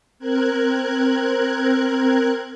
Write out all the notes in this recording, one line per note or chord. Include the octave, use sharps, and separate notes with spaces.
C4 A#4 F#6 G#6